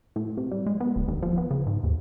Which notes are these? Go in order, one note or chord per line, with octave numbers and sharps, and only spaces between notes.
A2
C3
G3
G#3
B3
D1
D#2
F3
B3
C#3
G#2
D#2